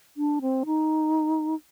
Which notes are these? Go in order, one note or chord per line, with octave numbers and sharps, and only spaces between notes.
D4
C4
D#4